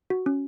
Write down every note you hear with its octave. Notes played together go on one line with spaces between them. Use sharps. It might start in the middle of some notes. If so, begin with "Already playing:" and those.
F#4
C#4